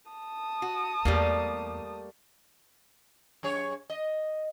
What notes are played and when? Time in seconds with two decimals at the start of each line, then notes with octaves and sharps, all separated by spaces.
0.11 A5 D#6
0.62 F#4
1.05 E2 G3 A3 A#3
3.43 F#2 G#4 C#5
3.90 D#5